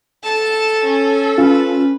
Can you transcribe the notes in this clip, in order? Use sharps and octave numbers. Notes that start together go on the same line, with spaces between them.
A4 A5
C#4
C#4 F4 B4